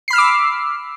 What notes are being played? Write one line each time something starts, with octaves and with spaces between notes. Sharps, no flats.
B5 D6 E6 F6 C7